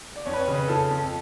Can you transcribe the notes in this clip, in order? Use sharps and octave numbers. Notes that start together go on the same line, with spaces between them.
D5
F2 C#5
B4
C#5
C#3
B4
F3 A4
F2